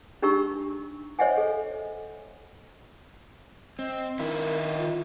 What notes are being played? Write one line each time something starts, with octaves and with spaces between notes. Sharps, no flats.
D4 D#4 G4 A#5 C#6 E6
C5 C#5 D#5 E5 F#5 G#5
A4
C4 D#5
D#3 D#4 E4 A#4
F4